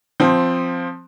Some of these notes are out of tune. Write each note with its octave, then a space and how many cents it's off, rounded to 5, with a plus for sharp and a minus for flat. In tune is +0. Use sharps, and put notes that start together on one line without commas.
F3 +5 C4 +0